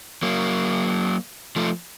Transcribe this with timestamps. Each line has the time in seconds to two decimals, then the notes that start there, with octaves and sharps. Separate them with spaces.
0.23 F#3 A#3
1.56 F3 A3